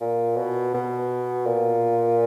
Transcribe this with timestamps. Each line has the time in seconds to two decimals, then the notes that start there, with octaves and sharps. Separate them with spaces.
0.01 A#2
0.37 B2
0.74 B2
1.46 A#2